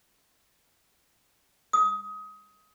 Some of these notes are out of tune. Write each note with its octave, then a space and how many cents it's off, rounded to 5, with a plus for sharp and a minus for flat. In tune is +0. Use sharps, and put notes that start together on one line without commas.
D#6 +25